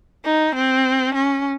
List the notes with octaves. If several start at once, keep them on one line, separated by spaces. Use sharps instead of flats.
D#4
C4
C#4